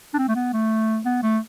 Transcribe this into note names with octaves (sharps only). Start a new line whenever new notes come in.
D4
C4
A3
B3
A3
B3
A3